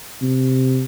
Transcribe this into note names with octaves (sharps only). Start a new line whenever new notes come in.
C3